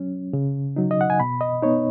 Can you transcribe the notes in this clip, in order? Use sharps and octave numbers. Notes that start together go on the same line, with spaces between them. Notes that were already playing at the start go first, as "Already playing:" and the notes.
Already playing: F#3 C#4
C#3
F#3 D#4
D#5
F#5
G#5
B2 B5
D#5
B3 D#4 C#5